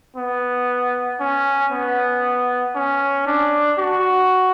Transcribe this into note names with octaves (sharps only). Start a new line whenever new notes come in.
B3
C#4
B3
C#4
D4
F#4